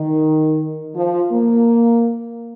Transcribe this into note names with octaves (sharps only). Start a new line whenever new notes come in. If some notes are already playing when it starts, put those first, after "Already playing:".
Already playing: D#3
F3
A#3